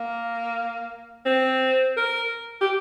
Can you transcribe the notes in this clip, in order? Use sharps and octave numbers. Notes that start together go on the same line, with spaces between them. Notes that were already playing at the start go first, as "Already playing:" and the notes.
Already playing: A#3
C4
A#4
G4